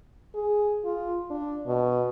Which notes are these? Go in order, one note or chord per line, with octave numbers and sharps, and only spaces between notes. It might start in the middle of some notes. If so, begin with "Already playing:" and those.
G#4
F4
D4
B2